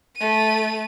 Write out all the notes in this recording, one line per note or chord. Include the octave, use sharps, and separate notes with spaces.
A3 D#7